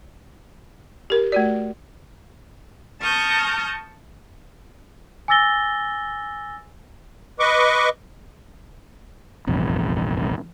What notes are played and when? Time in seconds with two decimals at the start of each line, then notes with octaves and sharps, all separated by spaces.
1.10 G4 A#4
1.32 A3 F#4 D5
3.01 A5 C#6 D#6 F6 G6 A#6
5.28 G#5 D6 E6 A6 A#6 G7
7.39 B4 D#5 C#6 D6
9.47 F1 A#1 E2 G2